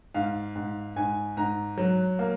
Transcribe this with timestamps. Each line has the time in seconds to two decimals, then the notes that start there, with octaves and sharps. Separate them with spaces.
0.14 G#2 F5
0.55 G#2
0.96 G#2 G#5
1.37 G#2 A#5
1.78 F#3
2.19 A#3